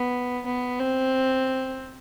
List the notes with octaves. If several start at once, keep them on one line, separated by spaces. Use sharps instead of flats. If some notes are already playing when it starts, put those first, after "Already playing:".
Already playing: B3
B3
C4